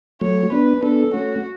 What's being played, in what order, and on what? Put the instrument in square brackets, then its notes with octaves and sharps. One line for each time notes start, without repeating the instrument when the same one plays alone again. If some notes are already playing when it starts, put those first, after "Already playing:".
[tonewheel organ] F#3 A3 [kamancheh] C#5
[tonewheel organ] B3 D4 [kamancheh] B4
[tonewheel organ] B3 D4 [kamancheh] A4
[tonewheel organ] A3 C#4 [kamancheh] F#4